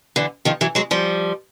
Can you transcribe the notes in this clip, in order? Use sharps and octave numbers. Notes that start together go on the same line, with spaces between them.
D3 E3
D#3 F3
E3 F#3
F#3 G#3
F3 G3